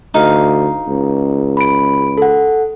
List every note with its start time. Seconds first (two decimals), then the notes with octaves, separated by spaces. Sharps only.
0.14 D2 D#4 F5
0.86 C#2
1.57 B5 D7
2.18 A4 F#5